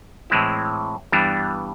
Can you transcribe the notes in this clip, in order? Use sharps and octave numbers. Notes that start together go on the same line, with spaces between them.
A2 E3 G#3 C4 E4
G2 E3 G3 B3 D4